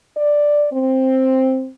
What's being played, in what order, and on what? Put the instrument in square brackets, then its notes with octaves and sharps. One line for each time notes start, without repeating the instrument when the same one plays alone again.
[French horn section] D5
C4